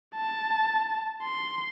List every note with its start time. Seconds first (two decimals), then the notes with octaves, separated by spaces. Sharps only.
0.15 A5
1.23 C6